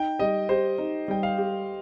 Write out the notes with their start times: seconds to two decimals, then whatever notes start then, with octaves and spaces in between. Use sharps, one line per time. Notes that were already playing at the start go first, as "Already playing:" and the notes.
Already playing: D#4 G5
0.19 G3 D#5
0.49 G4 C5
0.78 D#4
1.08 G3 G5
1.23 F5
1.38 G4